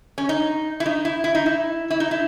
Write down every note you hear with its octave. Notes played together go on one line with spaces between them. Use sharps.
C#4
D#4
E4
D#4
E4
E4
D#4
E4
E4
D#4
E4